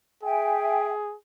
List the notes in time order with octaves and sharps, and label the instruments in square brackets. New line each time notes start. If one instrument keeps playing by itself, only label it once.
[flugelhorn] G#4 [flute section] E5 G5 G#5